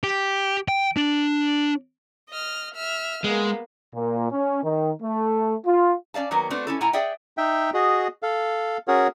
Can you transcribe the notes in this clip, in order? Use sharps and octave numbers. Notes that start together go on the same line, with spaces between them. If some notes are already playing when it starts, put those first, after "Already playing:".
G4
G5
D4
D#5 F6
E5 F6
G#3 A#3 B3
A#2
C#4
D#3
A3
F4
C#4 D5 F5 A5
D#3 F#3 A#3 B3
A3 B3 C4 D4 F#4
C#4 E4 A4
A2 E4 F#5 G#5 A#5
G#4 D5 E5 F#5 G5
D#4 E5 G5
F#4 G#4 D#5
A4 F5
C#4 F#4 G#4 A#4 C#5 F#5